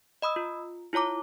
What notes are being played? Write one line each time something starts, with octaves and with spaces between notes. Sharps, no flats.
D#5 B5 D#6 E6
F4
E4 F4 C#5 A#5 D6